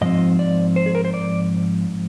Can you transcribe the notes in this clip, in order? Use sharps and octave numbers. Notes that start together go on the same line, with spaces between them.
G#2 F3 C4 D#5
D5
C5
G#4
A#4
C5
D5